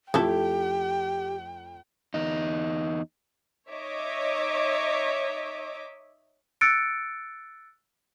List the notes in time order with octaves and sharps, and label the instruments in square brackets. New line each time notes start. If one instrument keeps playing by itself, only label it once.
[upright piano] F2 F3 [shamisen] A3 E4 A4 [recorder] G4 [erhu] G5
[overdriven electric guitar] E2 D#4
[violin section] D#4 C#5 D#5 E5 D6
[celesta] E6 F#6 A6 C#7 D7